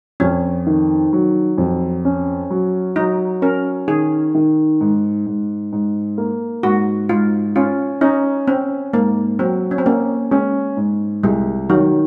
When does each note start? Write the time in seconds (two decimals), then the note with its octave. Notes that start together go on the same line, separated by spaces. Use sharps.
0.20 F2 C#4
0.67 D#3
1.13 F#3
1.58 F2
2.05 C#4
2.51 F#3
2.96 F#3 D#4
3.42 C#4 A#4
3.88 D#3 G#4
4.35 D#3
4.81 G#2
5.27 G#2
5.73 G#2
6.18 A#3
6.63 G#2 F#4
7.09 G#2 F4
7.56 C#4 F4
8.01 C#4 D#4
8.48 C4 C#4
8.93 G#2 A#3
9.39 F#3 C4
9.71 C#4
9.78 C4
9.86 A#3 C#4
10.31 G#3 C#4
10.77 G#2
11.23 C2 G#3
11.69 D#3 F#3